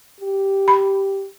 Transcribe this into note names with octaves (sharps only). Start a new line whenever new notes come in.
G4
B5